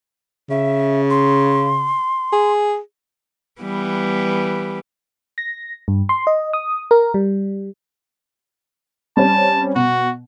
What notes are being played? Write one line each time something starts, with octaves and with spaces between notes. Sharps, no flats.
C#3 E5
C6
G#4
E3 G3 B3
A#6
G2
C6
D#5
D#6
A#4
G3
G3 C4 C#4 A5
B2 F#4